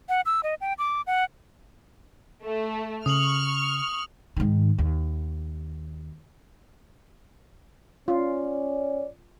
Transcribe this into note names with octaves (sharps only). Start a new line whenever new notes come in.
F#5
E6
D#5
G5
D6
F#5
A3
C#3 C#6 D#6 F6 F7 F#7
G#2 D#3
D#2
C#4 F4 D5